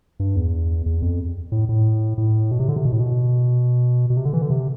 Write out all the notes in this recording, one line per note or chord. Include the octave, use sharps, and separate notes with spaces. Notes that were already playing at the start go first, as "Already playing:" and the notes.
G2
E2
E2
F2
A2
A2
A2
B2
C3
D3
C3
B2
A2
B2
B2
C3
D3
E3
D3
C3